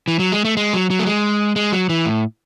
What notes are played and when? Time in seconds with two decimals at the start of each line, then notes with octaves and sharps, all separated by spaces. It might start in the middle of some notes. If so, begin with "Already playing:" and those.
0.08 E3
0.19 F#3
0.32 G#3
0.45 A3
0.57 G#3
0.74 F#3
0.90 F#3
0.99 A3
1.07 G#3
1.56 G#3
1.72 F#3
1.89 E3
2.06 A2